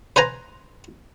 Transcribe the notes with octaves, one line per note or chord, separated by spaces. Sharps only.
B4 C5 G#5 A#5